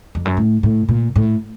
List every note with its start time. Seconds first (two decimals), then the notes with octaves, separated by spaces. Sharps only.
0.15 F2
0.25 F#2
0.37 A2
0.63 A2
0.89 A#2
1.16 A2